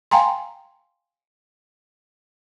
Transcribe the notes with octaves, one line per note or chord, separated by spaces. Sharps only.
F5 G5 G#5 A#5 C6